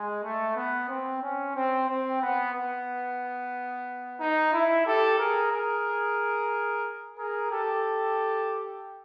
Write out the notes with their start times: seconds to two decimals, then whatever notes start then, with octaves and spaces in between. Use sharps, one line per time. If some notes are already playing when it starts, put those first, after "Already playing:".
Already playing: G#3
0.24 A3
0.56 B3
0.89 C4
1.22 C#4
1.56 C4
1.89 C4
2.22 B3
2.55 B3
4.21 D#4
4.53 E4
4.86 G4 A4
5.19 G#4 A#4
5.52 G#4 A#4
7.18 G#4 A#4
7.52 G4 A4